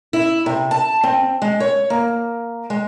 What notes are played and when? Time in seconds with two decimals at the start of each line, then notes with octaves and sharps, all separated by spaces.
0.13 E4
0.46 C3
0.71 A5
1.03 C4
1.42 G#3
1.60 C#5
1.90 A#3
2.70 G#3